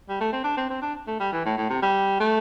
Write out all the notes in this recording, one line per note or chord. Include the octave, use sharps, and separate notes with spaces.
G3
A3
C4
D4
C4
C4
D4
A3
G3
E3
A2
A2
C3
G3
A3